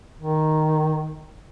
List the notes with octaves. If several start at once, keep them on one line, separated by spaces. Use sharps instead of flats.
D#3